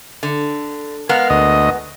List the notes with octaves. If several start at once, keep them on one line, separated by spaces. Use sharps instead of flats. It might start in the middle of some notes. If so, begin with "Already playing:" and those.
D3
G#3 B3 A#4 F5
D2 D#5